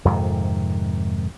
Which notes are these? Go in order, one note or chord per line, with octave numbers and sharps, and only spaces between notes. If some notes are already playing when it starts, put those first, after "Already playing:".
F2 G#2 C3 D#3